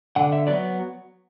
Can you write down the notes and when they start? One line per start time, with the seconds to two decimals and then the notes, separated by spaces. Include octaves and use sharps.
0.16 D3 F#5
0.33 E5
0.47 F#3 B3 D5